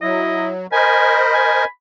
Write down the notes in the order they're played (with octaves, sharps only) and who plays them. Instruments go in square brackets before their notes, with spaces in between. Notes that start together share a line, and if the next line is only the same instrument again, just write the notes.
[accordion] F#3 [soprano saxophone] E4 [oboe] D#5
[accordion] A#4 C5 D#5 [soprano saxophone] G#5 [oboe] B5
[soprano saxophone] G#5